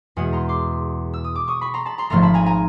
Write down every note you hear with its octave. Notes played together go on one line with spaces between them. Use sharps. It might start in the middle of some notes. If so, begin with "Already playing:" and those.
E2 B2 G#3 F#5 G#5
A#5 C6
C6 D6
E6
D#6
D6
C#6 D#6
B5 C#6
A#5 C6
A5 B5
A#5 C6
G#1 G#2 F3 A3 A#5 C6
A5 B5
G#5 A#5
G#5 A#5